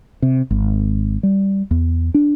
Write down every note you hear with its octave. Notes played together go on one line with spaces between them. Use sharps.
C3
G#1
G3
E2
D4